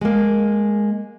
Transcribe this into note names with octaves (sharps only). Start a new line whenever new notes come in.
G#3 A#3